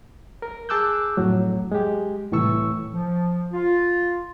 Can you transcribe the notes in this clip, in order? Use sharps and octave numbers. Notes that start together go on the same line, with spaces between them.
A#4
G#4 A5 D6 E6 F#6 G6
F2 A2 F#3
G#3 G4
C2 A2 E3 A4 C#6 E6
F3
F4